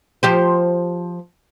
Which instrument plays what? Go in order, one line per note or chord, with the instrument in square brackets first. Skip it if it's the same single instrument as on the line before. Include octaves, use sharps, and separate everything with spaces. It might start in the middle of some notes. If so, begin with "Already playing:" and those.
[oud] F3 G4 C5